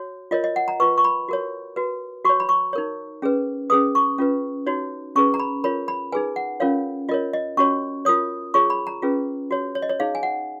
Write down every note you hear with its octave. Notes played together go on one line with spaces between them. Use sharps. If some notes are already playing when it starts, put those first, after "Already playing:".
Already playing: F#4 C#5
F4 A#4 C#5 D#5
D#5
F#5
A#5
F4 B4 C#6
C#6
B5
F#4 A#4 C#5
F#4 B4
F#4 C#5 C#6
B5
C#6
D#4 A#4 C#5
C#4 G#4 B4
C#4 G#4 B4 D#6
C#6
C#4 F4 B4
D#4 F#4 C#5
C#4 G#4 B4 C#6
A#5
B5
F4 A#4 C#5 B5
B5
D#4 G#4 B4 G#5
F#5
C#4 F4 A#4 C#5 F5
F4 A#4 C#5 D#5
D#5
C#4 F#4 C#5 C#6
F4 A#4 C#5 D#6
F4 G#4 C#5 C#6
B5
A#5
C#4 F4 G#4 B4
F#4 C#5
C#5
D#5
C#5
D#4 G#4 C#5 F5
G#5
F#5